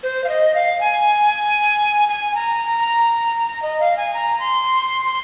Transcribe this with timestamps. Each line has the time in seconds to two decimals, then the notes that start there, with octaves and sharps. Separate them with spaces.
0.03 C5
0.24 F5
0.29 D#5
0.55 F5
0.81 G#5
2.09 G#5
2.35 A#5
3.62 D#5
3.80 F5
3.97 G#5
4.14 A#5
4.40 C6
5.05 C6